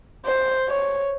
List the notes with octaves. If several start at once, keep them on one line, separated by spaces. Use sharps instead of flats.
C5
C#5